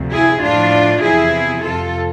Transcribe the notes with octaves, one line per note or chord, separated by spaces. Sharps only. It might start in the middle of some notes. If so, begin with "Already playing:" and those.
Already playing: D2 C3 F3
E4 G#4
A2 F3 D4 F4
E2 C3 F3 E4 G#4
F2 C3 F3 F4 A4